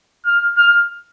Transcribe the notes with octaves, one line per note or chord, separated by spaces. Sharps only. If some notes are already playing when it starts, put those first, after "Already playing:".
F6
F6